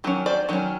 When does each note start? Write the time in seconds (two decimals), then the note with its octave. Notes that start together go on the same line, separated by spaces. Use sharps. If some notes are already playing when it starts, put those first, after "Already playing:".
0.04 D#3 F#3 C#4
0.26 C5 D5
0.49 D#3 F#3 C#4